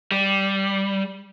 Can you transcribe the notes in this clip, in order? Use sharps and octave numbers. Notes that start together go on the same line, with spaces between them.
G3